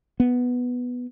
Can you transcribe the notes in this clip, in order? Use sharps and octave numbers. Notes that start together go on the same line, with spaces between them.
B3